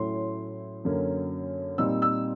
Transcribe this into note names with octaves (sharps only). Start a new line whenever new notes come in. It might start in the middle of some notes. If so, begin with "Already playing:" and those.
Already playing: A2 F#3 A3 C#4 E4 C6
F#2 D3 F#3 A#3 C#4
A#2 G3 C4 D#4 E6
E6